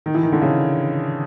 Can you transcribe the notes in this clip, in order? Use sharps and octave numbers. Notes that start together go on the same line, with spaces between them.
D#3
E3
D#3
D3
C#3